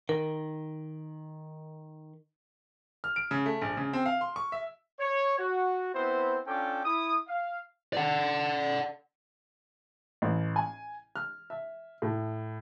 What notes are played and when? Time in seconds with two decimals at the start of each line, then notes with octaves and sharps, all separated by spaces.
0.09 D#3 A#4
3.04 F6
3.16 D7
3.31 C#3
3.46 A3
3.61 A#1
3.77 C#3
3.93 C4
4.06 F5
4.21 C6
4.36 C#6
4.52 E5
5.00 C#5
5.39 F#4
5.94 B3 C4 E4 C5
6.47 C#4 D4 F4 A4 G5 D6
6.85 E4 D#6
7.28 F5
7.93 D5 F#5
10.22 A1
10.56 G#5
11.16 F6
11.50 E5
12.02 A2